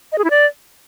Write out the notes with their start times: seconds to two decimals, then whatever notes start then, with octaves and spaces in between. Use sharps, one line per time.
0.12 D#5
0.18 G#4
0.24 E4
0.30 D5